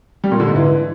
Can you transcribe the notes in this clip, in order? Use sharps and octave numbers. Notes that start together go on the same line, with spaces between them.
G3
A#2
D3
G#2
E3